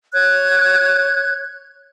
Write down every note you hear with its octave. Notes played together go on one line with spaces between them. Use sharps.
C#5 F#6 G#6